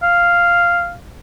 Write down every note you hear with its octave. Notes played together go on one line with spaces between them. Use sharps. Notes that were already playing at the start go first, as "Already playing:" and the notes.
F5